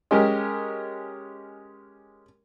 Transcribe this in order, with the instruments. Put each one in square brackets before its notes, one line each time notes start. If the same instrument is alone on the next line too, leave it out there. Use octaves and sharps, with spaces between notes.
[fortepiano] G#3 C#4 G4 G#4 A#4